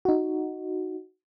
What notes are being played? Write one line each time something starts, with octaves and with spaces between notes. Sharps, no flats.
D#4 F#4